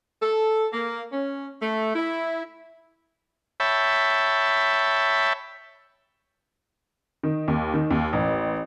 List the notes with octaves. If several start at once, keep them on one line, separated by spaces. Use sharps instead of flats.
A4
A#3
C#4
A3
E4
C#5 E5 G5 A5 B5
D#3
D#2
D#3
D#2
A1